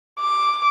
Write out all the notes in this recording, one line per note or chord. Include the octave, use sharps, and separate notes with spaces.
D6